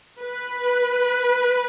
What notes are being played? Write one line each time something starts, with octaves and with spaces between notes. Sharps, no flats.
B4